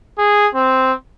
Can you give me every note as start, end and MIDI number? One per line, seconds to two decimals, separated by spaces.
0.18 0.47 68
0.55 0.93 60